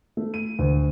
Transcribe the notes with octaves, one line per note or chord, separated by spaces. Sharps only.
A3
D#7
D2